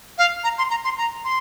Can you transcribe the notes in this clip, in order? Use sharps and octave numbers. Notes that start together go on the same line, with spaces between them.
F5
A#5
C6
A#5
C6
A#5
C6